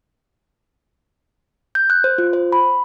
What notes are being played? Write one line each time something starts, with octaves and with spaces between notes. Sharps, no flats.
G6
F#6
C5
F4
C5
B5